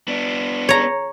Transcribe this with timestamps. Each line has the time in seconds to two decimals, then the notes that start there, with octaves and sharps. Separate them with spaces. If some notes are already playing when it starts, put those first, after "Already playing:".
0.08 B3 D4
0.69 C#5 A#5